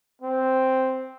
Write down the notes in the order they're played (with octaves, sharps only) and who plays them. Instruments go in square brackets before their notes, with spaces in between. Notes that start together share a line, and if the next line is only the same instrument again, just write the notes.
[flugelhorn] C4